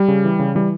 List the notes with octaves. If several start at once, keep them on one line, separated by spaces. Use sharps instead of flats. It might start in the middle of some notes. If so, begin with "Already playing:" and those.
Already playing: G3
C#3
E3
C#3
E3 G3